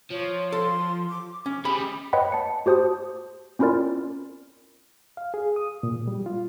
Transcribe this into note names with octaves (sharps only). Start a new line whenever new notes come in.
F3 C#5
A4 C6
D6
C#4 D6
G3 G#4 B5
B4 C#5 D#5 F#5 G5 B5
A5 C#7
F#4 G4 C5 A5 D#6
C4 C#4 E4 F4 A#4 D5
F5
G#4
D#6
A#2
G3
F4